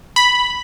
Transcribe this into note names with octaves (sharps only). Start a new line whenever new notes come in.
B5